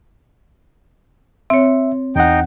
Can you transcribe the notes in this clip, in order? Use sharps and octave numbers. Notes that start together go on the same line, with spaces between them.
C4 C#5 E5
E2 D#4 F#5 G5